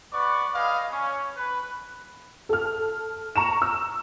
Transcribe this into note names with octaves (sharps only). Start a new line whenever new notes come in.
B3 B4 D5 F#5 C#6
G#4 B4 D5 D#5 F5
C#4
B4
A4 F6
A#5 C#6 E7
E6